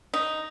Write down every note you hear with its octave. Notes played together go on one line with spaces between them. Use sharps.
D#4